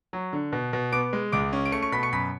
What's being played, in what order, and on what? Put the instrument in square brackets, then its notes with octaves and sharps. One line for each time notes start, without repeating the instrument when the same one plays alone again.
[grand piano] F#3
D3
B2
B2
B3 D6 D7
G#3
C#2 D6 D7
C#4
D7
A3 C#6 C#7
C#6 C#7
B2 B5 B6
C#6 C#7
F#2 B5 B6